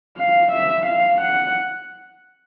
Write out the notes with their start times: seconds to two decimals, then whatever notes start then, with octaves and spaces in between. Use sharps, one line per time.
0.17 F5
0.52 E5
0.86 F5
1.21 F#5